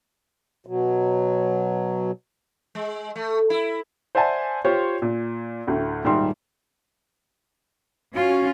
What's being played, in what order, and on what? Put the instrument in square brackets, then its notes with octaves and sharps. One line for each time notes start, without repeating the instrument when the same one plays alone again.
[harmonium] B2 F#3
[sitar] G#3
A3
E4
[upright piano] C5 D5 E5 F#5 G#5 A5
F4 G4 C5 C#5 C6
A#2
D2 A2
D#1 G#2 G3 E5 C6
[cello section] C#4 F4 [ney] F#4